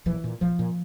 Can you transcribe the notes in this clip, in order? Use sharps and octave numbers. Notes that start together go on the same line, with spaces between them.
A#1 E3
A#2
A#1 F3
A#2